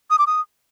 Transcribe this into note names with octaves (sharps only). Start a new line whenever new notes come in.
D#6
D6
D#6